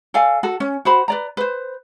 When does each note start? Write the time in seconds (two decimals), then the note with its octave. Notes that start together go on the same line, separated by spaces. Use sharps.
0.14 A4 D5 F5 G#5
0.43 F#4 A4
0.60 C#4
0.85 F#4 C5 B5
1.08 B4 D5 A#5
1.37 B4 C5